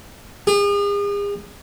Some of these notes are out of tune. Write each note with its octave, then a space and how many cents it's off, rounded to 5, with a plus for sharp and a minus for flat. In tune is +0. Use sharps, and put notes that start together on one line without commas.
G#4 -40